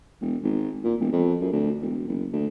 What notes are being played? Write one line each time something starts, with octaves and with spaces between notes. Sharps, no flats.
E1
G#1
A#2
E1
F2
F#2
D2
E1
F#1
D2